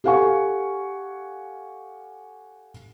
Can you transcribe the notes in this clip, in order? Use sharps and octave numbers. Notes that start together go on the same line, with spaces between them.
G4 A4 F5 F#5 G#5 C#6